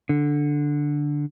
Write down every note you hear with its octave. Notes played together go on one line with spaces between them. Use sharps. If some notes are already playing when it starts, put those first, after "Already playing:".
D3